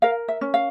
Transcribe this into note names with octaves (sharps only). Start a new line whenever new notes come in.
A#4 F5
E5
C#4
F5